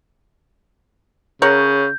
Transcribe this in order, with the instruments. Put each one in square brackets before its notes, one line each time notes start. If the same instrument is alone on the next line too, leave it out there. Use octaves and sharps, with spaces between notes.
[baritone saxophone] C#3 [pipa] A#4 C#5 F#5 [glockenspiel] G6